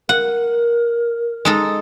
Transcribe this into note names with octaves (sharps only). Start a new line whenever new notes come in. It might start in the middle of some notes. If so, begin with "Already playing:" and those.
A#4 F#5
G#3 D#4 A4